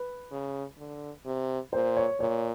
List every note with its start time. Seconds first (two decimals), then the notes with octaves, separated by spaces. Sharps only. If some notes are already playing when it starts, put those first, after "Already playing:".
Already playing: B4
0.31 C#3
0.78 D3
1.26 C3
1.73 A#2 C5
1.97 C#5
2.20 A#2 C#5